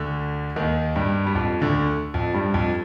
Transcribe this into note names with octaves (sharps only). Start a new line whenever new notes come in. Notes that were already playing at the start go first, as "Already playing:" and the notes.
Already playing: D2 D3
D#2 D#3
G2 G3
G3
F2 F3
D2 D3
F2 F3
G2 G3
F2 F3